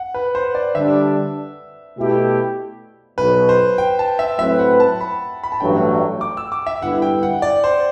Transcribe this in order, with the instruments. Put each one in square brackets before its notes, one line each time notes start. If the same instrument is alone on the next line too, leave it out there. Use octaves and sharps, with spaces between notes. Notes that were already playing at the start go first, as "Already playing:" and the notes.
Already playing: [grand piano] F#5
B4
C5
D5
[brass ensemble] D3 G3 D4 [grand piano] E5
[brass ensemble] B2 A3 E4 G4
[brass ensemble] B1 B2 F#3 [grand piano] B4
[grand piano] C5
G5
A5
E5
[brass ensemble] A2 F#3 C4 E4 B4 [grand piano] E5
[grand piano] F#5
A5
B5
B5
A5
[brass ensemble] A1 G2 F#3 A3 [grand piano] G5
[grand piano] D6
E6
D6
E5
[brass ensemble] G2 D3 G3 B3 E4 [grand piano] F#5
[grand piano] G5
F#5
D5
C5